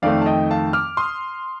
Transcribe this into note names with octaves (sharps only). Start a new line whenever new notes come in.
F2 D#3 A3 C4 D5 F5
A5
D#5 G5
F5 A5
D6 F6
C6 D#6